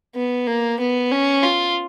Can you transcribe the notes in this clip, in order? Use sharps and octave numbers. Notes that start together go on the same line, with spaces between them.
B3
A#3
B3
C#4
F4